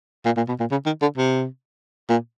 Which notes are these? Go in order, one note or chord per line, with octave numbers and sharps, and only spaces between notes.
A#2
A#2
B2
A#2
C#3
D#3
D3
C3
A#2